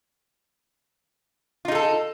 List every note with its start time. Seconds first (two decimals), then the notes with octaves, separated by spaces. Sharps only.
1.65 F4
1.68 D#4
1.72 G#4
1.75 A4